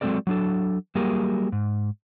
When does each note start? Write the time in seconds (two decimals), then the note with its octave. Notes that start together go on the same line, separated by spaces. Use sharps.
0.01 F#3 G#3 C4 A4 A#4 D5
0.27 F#3 D4 A4
0.95 F#3 G3 A#3 G4 G#4 A#4
1.52 G#2